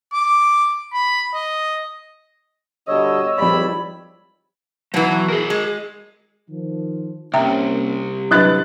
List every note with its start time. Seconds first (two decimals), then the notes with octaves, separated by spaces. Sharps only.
0.13 D6
0.94 B5
1.34 D#5
2.88 B2 D3 G3 C#5 D#5 E6
3.38 G#1 E3 F3 G3 D5 B5
4.94 B2 E3 F#3 F#5
5.28 G#4 A#4
5.50 G#3
6.50 D#3 F3
7.34 C2 A#3 C4 C#4 E5 G5 A#5
8.31 A1 D2 F#3 D4 E4 B4 F#6 A6